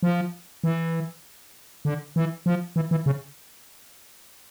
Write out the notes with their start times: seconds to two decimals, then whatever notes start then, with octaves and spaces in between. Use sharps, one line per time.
0.03 F3
0.64 E3
1.85 D3
2.16 E3
2.46 F3
2.76 E3
2.91 E3
3.06 C#3